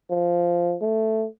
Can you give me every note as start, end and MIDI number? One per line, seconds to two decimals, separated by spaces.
0.10 0.76 53
0.81 1.27 57